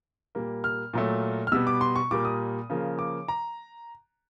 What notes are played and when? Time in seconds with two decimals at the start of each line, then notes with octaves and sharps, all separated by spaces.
0.35 A#2 G3 A#3
0.64 F6
0.93 A#2 F#3 A3
1.47 F6
1.52 B2 G3 B3 E6
1.67 D6
1.81 C6
1.96 C#6
2.11 A#2 G3 A#3 D6
2.25 D#6
2.70 C#3 F3 A#3
2.99 D6
3.28 A#5